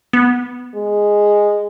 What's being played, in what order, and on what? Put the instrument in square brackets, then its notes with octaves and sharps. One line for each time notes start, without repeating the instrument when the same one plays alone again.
[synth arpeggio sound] B3
[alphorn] G#3